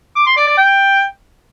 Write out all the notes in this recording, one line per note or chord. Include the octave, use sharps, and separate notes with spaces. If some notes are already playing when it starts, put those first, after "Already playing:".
D6
C6
D5
D5
G5